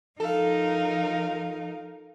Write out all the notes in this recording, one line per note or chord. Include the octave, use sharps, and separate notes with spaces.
F3 D#4 A4 A#4 F5